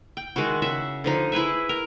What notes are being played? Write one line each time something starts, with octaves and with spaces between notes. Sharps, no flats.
G5
D#3 G#3 E4 F#4
C#3 F#4 E5
D3 F3 D#4
E4 G#4 B4 E5
A#4